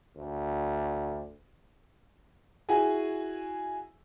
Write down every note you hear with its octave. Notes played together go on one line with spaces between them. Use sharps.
D2
E4 F#4 G#4 G#5